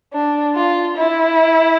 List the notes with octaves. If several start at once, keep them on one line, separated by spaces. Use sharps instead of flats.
D4
F4
E4